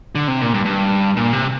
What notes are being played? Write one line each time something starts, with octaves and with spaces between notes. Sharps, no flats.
D3
C3
A#2
G2
G2
A#2
C3